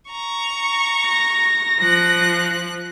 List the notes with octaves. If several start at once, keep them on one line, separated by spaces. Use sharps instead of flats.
A#5 C#6
A#6
F3 F#6